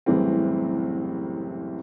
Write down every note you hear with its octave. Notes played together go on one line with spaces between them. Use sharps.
F#1 C2 A2 E3 C4